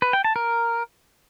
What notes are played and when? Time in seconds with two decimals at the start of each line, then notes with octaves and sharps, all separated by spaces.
0.02 B4
0.13 G5
0.24 A5
0.36 A#4